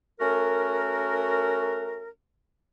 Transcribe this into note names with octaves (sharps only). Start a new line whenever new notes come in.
A3 C#4 F#4 A#4